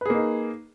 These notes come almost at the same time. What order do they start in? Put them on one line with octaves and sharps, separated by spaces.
B4 G#4 A#3 D#4